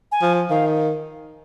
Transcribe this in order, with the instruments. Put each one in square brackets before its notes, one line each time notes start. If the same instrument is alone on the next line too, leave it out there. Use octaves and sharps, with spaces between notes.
[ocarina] G#5
[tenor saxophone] F3
[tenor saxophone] D#3 [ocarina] F5